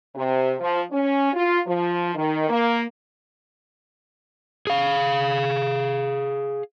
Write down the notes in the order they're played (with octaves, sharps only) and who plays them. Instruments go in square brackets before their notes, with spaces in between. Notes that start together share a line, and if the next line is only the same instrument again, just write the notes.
[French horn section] C3
F3
C#4
F4
F3
D#3
A#3
[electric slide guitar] G#4 F5